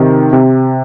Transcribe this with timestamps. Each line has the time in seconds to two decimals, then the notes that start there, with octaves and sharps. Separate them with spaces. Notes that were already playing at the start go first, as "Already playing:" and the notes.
Already playing: C3 D#3
0.33 C3